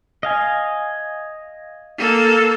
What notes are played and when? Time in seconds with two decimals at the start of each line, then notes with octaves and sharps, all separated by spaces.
0.23 D#5 F5 G#5
1.98 A#3 A4